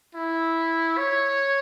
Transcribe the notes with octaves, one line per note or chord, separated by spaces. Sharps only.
E4
C#5